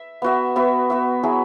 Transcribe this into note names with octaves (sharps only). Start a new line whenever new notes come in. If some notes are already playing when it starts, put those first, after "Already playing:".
Already playing: E5
B3 F#4 E5
B3 F#4 E5
B3 F#4 E5
F#3 E4 G#4